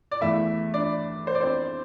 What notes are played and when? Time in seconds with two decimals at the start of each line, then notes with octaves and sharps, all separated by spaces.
0.11 D5
0.21 E2 E3 A3 E4 E5
0.74 D4 D5
1.27 C5
1.35 D5
1.41 C4 C5